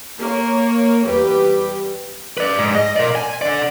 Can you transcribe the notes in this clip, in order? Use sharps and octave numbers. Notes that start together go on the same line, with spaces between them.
A#3 C#5
E2 G3 G4 B4
B4 D5
G#2
D#5
A#4 D5
G#5
D3 D5